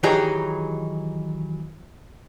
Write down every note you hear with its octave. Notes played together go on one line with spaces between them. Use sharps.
D#3 E3 F#3 D#4 G4 G#4